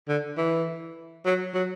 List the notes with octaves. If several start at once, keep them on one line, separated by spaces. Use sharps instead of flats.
D3
E3
F#3
F#3